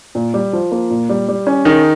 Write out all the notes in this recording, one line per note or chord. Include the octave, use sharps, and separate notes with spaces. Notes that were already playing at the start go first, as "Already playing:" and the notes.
A#2
G3
F3
A#3
A#2
G3
G3
C#4
D#3 D#4 G#4